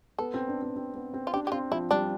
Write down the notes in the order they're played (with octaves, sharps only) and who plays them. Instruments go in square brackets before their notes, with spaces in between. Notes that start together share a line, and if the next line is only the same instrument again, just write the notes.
[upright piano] B3 [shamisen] A4
[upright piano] C4
D4
C4
C4
B3
C4
[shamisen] F4
[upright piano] D4 [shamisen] G4
[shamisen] G4
[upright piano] C4 [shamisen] F4
[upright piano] F3 [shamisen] E4
[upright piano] G3 [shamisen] D4